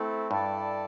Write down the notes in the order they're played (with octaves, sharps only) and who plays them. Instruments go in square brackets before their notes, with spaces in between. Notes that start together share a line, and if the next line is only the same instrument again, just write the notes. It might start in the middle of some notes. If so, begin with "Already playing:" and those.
Already playing: [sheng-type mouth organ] A3 C4 E4 A4
[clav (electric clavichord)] G2 [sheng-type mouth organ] E4 A4 D5 A5